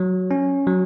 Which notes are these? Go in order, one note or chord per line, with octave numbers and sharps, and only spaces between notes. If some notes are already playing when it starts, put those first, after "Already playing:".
Already playing: F#3
C#4
F#3